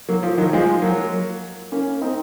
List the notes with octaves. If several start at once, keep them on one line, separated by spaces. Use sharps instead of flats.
F#3 A#3
F3
D#3 F#3
F3 G#3
F#3 A#3
A#3 C#4
C4 D#4